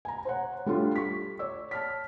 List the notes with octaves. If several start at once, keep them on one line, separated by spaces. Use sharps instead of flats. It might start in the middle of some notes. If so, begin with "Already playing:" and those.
G#5 A#5
C5 C#5 F#5
G3 A3 D4 F4
C#6 B6
C#5 D5 E6
A5 F6 B6